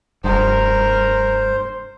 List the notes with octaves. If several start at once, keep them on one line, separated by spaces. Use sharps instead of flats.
F1 G2 A#4 C5